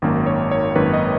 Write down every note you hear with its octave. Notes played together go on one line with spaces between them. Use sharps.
G#1 F#2 D#3 A#3
C#5
C#5
G#1 F#2 D#3 A#3 B4
D#5